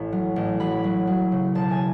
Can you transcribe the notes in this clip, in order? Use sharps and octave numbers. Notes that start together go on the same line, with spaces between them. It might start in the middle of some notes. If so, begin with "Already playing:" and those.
Already playing: A1 C#6
F#3
A1
F#3 B5
F#3
F#3
C#3
E1 A5
G#5